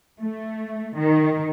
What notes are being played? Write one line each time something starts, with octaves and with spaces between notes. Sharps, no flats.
A3
D#3